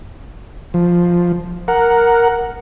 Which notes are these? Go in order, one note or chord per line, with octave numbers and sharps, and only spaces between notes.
F3
A#4 F#5